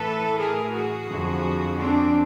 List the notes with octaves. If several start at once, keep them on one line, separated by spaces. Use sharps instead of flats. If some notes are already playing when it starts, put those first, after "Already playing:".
Already playing: A2 E3 A4 B4
G#4 A#4
F#4 G#4
F2 D3 F3
C4 D4